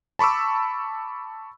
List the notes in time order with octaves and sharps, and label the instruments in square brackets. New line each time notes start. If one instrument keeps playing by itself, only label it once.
[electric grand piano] A5 B5 C#6 D6 E6